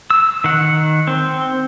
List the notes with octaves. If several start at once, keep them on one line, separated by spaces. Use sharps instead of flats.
E6
D#3 F#5
C4